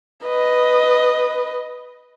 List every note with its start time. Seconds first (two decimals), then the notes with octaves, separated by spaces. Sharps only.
0.24 B4 D#5